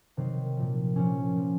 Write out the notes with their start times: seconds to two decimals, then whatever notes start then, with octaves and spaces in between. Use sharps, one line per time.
0.17 C3 D#3 F#3 C4
0.57 A#2 F3
0.96 A#2 F3 C#4
1.36 A#2 F3